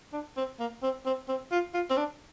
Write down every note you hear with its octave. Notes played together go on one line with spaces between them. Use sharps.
D4
C4
A#3
C4
C4
C4
F4
F4
C4
D4